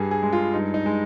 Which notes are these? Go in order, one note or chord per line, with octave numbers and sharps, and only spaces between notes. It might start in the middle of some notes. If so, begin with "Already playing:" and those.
Already playing: G2 G3 G#4
G#4
G#3
F4
G2 D#4
D#4
G#3